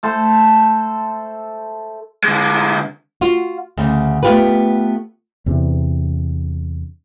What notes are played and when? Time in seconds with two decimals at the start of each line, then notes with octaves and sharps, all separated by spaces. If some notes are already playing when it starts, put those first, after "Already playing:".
0.03 A3 A4 C5
2.24 D3 G#3
3.21 F4 F#4
3.78 D2 C#3
4.23 A3 B3 F4 G4 B4
5.46 E2 C3 D4